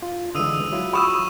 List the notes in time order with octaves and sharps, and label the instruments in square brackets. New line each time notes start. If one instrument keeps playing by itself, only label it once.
[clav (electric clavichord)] F4
[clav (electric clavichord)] D3 E3 G#3 [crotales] D#6 E6 D#7
[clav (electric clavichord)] F#3 E4 F4
[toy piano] B5 D#6 E6 [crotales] C#6 E7